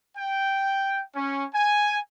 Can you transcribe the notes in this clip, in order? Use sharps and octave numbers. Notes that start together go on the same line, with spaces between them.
G5
C#4
G#5